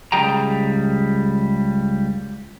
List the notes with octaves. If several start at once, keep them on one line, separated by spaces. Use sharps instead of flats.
C#2 G3 G#4 G5 A#5